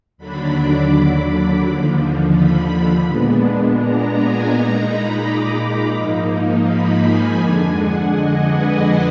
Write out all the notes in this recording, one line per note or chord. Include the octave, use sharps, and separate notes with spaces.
D#2 D3 F#3 D4 B5
D6
B5
D#2 D3 F3
B5
A#2 G#3 B3 D4
A#5
G#5
A#2 G#3 D#4 A#5
B5
D6
G#2 F3 A#3 D#4
B5
G#5
F2 D3 G#3 D4 G#5
F#5
D#5
B4